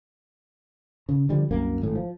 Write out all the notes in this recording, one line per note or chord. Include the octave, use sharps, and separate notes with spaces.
C#3
D3 F3 G3
C2 F#2 A#3
G#1 A2
F3